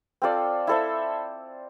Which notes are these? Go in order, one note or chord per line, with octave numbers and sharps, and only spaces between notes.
C4 F4 A4 D5
E4 A4 C5 E5